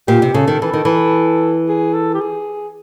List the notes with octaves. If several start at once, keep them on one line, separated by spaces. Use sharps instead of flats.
A#2 G4
C3
C#3 A4
D#3
E3 A4
D#3
E3
G#4
A4
G4
G#4